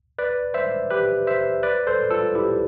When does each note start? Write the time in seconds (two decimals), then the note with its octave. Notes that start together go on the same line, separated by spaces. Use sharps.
0.19 B4 D5
0.54 C5 E5
0.90 G4 B4
1.27 C5 E5
1.63 B4 D5
1.87 A4 C5
2.10 F4 A4
2.35 E4 G4